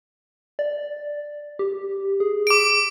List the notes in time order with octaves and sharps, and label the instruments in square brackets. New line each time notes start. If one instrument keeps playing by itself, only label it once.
[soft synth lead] D5
G4
G#4
[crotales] D6 D7